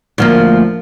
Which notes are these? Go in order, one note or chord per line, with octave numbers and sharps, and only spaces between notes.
D2 F3 A#3